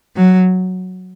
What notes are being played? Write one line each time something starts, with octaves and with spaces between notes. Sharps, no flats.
F#3